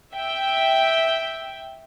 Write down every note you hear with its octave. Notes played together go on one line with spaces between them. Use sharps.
E5 G5